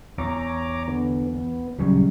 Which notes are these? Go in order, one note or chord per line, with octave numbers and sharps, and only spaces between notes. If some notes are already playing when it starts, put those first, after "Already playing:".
E2 C#5 A#5 D6
D3 B3
B3
D#1 C#3 F#3 G3 C#4